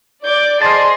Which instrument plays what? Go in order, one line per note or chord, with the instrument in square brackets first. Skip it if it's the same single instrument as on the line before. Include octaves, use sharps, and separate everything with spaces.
[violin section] D5 [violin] D6 G6
[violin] G#4 D#5 [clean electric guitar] C5 A5 [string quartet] C6